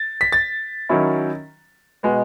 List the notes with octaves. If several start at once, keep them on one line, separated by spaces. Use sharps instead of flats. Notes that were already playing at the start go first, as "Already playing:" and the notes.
Already playing: A6
B6
A6
D#3 F#3 C#4 E4
B2 G#3 B3